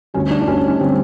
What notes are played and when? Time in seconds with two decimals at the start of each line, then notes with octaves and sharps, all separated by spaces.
0.14 D2 D3 G3 C#4
0.31 D4
0.42 D4
0.47 D2 D3 G3 C#4
0.68 C#4
0.80 D3 G3 C4